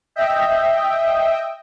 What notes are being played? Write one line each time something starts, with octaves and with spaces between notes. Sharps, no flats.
D#5 E5 G5